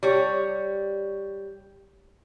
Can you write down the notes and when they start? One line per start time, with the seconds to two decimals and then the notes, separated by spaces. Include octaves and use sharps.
0.03 G3 C#5